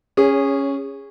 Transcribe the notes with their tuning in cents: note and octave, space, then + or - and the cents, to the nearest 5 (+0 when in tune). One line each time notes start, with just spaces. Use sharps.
C#4 +0 G#4 -20 C#5 +20